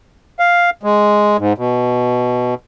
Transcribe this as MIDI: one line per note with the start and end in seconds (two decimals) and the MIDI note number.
0.39 0.70 77
0.83 1.37 56
1.38 1.53 44
1.58 2.54 47